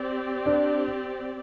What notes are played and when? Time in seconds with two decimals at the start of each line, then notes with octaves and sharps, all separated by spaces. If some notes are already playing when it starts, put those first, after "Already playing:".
Already playing: C4 G4 D5
0.46 D4